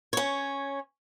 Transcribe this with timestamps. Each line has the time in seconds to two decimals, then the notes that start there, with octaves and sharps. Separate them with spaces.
0.13 C#4 C#5